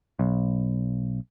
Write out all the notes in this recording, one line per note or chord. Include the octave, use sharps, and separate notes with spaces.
B1